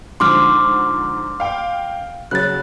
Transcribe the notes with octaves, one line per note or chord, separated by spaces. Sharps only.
G#2 D3 F3 C6 D6 F6
F5 G5
C#3 F#3 F#6 A6